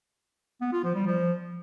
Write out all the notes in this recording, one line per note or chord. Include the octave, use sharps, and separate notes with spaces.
B3
F4
F3
G3
F3